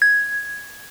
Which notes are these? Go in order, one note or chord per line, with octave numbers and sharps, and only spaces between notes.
G#6